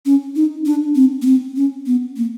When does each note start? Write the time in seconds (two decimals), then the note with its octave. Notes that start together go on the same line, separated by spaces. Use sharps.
0.06 C#4
0.36 D#4
0.66 D4
0.95 C4
1.22 B3
1.26 C4
1.56 C#4
1.86 B3
2.16 A#3